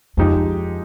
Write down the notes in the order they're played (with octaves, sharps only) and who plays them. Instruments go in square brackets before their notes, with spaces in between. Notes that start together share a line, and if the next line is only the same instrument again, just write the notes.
[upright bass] F2 [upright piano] F3 G#3 D#4 G4